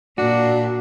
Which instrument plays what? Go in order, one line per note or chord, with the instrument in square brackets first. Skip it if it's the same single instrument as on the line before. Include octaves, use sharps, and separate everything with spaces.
[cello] A#2 [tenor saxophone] D4 [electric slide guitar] F#4